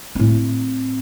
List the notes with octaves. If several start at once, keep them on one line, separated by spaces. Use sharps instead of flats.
A2 C4